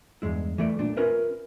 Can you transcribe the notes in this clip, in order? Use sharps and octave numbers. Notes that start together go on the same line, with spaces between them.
E2 G2 G#3 E4
E3 A3 D5
B1 A#2 D4
C#4 F4 A#4 B4 E5